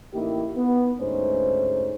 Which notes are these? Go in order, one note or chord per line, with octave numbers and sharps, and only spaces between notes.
A1 A#3 D#4 E4 G4
B3
D2 G#2 A3 C#4 D#4 C5